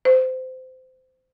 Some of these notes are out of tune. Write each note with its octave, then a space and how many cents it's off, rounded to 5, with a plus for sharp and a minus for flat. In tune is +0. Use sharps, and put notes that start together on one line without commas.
C5 -25